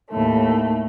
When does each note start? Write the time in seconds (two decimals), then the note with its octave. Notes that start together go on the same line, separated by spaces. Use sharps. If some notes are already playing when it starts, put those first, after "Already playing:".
0.11 D#2 A2 A3